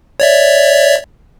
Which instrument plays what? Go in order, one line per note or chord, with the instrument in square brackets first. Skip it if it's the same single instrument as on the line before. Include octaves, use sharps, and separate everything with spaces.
[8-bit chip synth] C#5 D5 E5